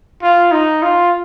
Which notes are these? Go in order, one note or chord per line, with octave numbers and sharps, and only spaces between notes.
F4
D#4
F4